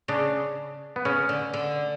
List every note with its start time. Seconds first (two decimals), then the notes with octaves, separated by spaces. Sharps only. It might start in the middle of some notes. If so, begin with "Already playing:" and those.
0.08 C#3 D4
0.96 B3
1.05 C#3 C#4
1.29 D3
1.54 D3